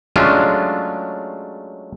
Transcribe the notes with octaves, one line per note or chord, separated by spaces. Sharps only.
F#3 G#3 A3 C#4 D4 F4